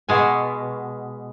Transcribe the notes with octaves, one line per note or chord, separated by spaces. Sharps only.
B2 G#3 G#5